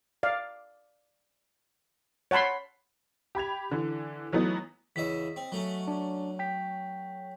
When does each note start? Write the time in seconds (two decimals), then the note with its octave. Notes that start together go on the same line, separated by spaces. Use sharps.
0.23 D5 F5
2.31 C#5 F#5 A5 B5 C6
3.35 G4 B5 G#6 F7
3.71 D3 E3
4.32 E3 F#3 A3 B3 D#4
4.96 E2 C#3 D#5 E5 B6
5.36 C4
5.52 F#3 A3 C#4
5.88 D4
6.39 G5 B6